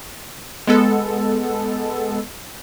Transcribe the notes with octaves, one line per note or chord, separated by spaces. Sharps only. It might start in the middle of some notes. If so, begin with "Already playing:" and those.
G#3 B3 A4